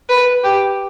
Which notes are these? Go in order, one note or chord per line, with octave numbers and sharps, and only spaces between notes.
B4
G4